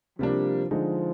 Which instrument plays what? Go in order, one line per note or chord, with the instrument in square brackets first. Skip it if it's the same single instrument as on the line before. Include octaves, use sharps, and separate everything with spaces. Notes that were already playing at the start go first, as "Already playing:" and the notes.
[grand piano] C3 G3 A#3 D4 [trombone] F3
[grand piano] D3 G#3 D#4 [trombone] F3